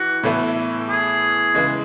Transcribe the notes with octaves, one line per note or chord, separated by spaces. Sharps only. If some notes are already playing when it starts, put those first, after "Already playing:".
Already playing: E3 F#4
A2 E3 B3 E4
G#4
C#3 E3 G#3